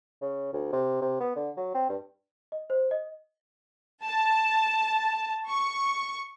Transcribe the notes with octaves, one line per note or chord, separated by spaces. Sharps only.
C#3
D2
C3
C3
B3
D3
F#3
C4
G2
D#5
C5
D#5
A5
C#6